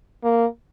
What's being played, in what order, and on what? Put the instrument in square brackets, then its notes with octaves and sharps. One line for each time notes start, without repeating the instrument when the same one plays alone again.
[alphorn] A#3